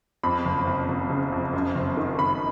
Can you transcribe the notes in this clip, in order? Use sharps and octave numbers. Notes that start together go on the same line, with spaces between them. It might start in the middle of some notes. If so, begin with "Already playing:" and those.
F2 B5
F#1
F#1
F#1
C#3
F2
F#2
F#1
D#3
F#1 B5